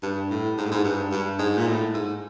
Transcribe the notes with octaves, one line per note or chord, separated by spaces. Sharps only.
G2
A2
G#2
A2
G#2
G2
G2
G#2
A#2
A2
G#2